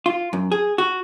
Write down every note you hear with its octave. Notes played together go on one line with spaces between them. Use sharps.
F4
F#2
G#4
F#4